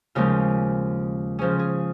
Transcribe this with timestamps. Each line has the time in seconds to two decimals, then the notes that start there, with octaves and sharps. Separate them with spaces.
0.15 D#2 C#3 F3 G#3 F4
1.39 C#3 F3 C#4 G#4
1.59 G#4